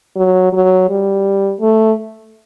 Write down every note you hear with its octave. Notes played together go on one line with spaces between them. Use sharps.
F#3
F#3
G3
A3